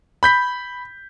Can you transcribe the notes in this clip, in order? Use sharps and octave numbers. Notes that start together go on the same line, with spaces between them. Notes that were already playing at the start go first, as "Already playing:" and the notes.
B5 G6 B6